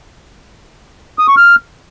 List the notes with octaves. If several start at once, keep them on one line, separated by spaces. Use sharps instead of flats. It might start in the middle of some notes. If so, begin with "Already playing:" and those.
D#6
C#6
F6